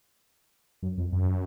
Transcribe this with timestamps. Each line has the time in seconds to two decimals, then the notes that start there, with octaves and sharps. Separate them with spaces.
0.83 F#2
0.98 F2
1.12 F#2